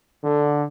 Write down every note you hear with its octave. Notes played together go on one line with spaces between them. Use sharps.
D3